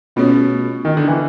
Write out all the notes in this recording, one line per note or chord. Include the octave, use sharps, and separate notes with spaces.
B2 A3 C#4 F4 G#4 C#5
D#3
D3
E3